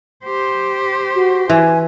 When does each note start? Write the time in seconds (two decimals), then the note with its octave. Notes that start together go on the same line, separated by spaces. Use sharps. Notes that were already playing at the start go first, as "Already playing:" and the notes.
0.24 G4 C5
1.15 F#4
1.50 E3 G#5